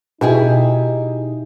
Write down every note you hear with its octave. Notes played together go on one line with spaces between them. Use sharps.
B2 D#4 E4 G4 G#4